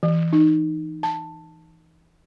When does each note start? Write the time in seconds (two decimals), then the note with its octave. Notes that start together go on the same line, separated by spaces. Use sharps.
0.03 E3
0.33 D#4
1.03 A5